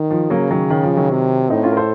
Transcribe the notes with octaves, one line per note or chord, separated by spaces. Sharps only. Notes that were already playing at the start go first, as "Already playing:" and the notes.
Already playing: D#3
F3
C#3 F#3 A#3
D#3 F#3
D#3
F3
D#3 F#3
C3
A2 C4 D#4
C#4 F4
A#4
A4 C5